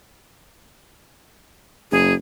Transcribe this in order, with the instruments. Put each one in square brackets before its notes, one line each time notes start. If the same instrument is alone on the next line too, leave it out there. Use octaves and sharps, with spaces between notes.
[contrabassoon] F#1 [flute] G#4